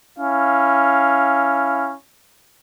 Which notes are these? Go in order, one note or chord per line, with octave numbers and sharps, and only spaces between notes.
C#4 E4 F5